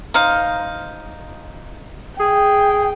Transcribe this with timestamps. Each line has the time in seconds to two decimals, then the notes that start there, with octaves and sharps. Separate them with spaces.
0.14 D#4 C5 F5
2.19 G#4 G5